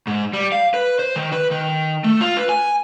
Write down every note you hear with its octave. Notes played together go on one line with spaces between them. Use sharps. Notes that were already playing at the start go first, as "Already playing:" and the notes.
G#2
G3
F5
B4
C5
D#3
B4
D#3
A3
F4
B4
G#5